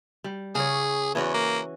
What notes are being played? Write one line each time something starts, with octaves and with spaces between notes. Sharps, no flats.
G3
C#3 G#4 C#5
E2 E3 C#4 F#4
A#3